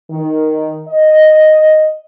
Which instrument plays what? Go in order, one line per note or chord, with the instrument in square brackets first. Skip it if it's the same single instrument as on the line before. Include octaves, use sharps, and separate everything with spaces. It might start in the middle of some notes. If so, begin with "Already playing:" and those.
[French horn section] D#3
D#5